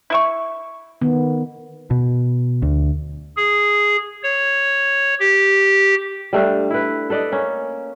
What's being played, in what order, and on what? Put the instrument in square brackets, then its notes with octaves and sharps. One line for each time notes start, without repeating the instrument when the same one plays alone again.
[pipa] E4 E5 C#6
[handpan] D#3 B3
[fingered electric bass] B2
D2
[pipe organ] G#4
C#5
G4
[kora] G3 A3 D4 F5
E4 B4
A4 B4 D5 D#5
A#3 C#4